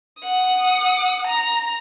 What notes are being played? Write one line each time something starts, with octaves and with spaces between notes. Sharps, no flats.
F#5 D#6
A#5